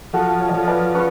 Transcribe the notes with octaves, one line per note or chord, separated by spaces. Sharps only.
F3 F#4 A4
C#5
D5
F3 A4 C#5
B4 D5
C#4 G#4 B4